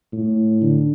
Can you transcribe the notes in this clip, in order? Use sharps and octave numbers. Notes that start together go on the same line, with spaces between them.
A2
D3